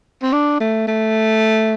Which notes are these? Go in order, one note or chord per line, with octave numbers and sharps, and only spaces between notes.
C4
D4
A3
A3